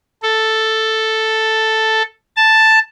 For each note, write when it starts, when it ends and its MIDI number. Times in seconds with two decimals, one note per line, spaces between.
0.22 2.02 69
2.36 2.79 81